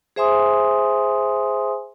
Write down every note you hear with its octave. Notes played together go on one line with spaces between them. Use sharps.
G#4 C5 E5 G#5 C6 D#6